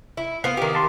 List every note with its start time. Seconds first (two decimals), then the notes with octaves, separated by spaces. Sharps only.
0.17 E4
0.44 B3 C5 F5
0.57 D#3 G4
0.75 A5 C6